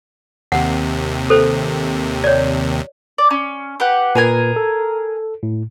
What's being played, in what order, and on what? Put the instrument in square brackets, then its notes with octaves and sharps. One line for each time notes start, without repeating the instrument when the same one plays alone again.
[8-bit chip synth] D#2 C3 [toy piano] F#5
[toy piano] A4 C5
C#5 D5
[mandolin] D5
C#4
G4 B4 F#5
[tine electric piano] A#2 B4 [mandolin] G#4 A#4 G#5
[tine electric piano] A4
A2